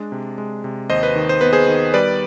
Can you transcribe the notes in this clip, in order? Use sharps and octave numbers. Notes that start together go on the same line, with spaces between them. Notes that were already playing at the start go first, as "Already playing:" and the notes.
Already playing: G#3 D4
C3
G#3
C3
D#2 C5 D#5
B4
D#3
C5
B3 B4
G#4 C5
D#3
G3 B4 D5